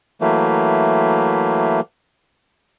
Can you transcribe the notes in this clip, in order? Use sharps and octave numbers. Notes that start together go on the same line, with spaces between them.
E3 F#3 A3 A#3